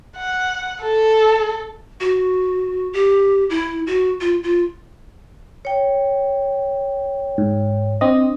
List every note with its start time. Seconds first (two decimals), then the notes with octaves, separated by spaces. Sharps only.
0.17 F#5
0.82 A4
2.00 F#4
2.93 G4
3.50 E4
3.87 F#4
4.21 F4
4.43 F4
5.65 C#5 G5
7.38 G#2
8.01 C4 D4 D#5